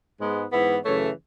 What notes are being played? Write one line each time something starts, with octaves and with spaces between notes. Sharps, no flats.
G#2 G#3 B3
G#2 E3 B3 E4
F#2 C#3 E3 A3 C#5